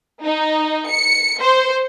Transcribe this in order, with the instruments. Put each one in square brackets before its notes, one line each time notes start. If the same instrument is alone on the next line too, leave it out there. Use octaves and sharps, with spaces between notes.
[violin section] D#4
C#7
C5